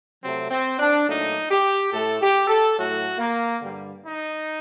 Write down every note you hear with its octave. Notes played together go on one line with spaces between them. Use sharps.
C3 F#3 A3 C4
C4
D4
A#2 F#3 A3 D#4
G4
A2 A3 A4
G4
A4
A2 F#3 A3 F#4
A#3
G2 D3 G3
D#4